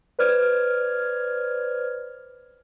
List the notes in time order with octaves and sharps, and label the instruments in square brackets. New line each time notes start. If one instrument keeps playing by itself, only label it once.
[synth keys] B4 C5 D5 F6 G#6